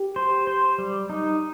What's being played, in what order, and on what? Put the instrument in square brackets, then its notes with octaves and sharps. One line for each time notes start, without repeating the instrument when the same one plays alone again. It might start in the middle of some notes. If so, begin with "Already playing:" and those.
Already playing: [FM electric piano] G4
[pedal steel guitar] C5
C5
G3
D#4